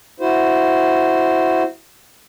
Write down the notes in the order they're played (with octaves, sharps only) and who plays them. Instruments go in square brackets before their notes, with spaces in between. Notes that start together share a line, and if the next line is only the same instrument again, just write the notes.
[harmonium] E4 F#4 C5